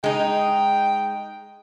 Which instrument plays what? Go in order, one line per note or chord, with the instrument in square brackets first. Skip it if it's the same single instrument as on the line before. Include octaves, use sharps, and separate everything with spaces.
[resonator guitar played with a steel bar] G#3 D#4 [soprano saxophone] G5